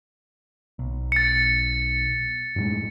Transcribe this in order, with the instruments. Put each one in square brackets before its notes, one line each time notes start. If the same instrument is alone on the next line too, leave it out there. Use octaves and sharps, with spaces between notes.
[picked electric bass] B1
[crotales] A6 C#7
[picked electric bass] F#2 A2 G#3